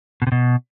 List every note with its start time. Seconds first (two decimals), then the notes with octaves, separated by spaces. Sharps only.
0.22 B2
0.27 C3
0.32 B2